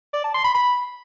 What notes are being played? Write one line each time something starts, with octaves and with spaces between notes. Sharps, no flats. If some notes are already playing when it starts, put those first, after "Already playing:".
D5
A5
C6
B5
B5